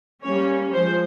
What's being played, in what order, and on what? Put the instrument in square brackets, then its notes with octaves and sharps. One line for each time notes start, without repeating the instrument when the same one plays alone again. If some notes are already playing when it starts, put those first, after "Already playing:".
[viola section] G3 A#3 C#4 C#5
F3 G#3 C5